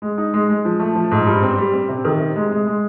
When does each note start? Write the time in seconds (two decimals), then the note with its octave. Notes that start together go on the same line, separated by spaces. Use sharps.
0.02 G#3
0.18 D#4
0.34 G#3
0.49 G#3
0.65 F3
0.80 A3
0.95 F3
1.11 G#2
1.27 G2
1.42 C4
1.58 G3
1.73 C4
1.89 C3
2.05 D#3
2.20 C3
2.36 G#3
2.51 G#3
2.67 G#3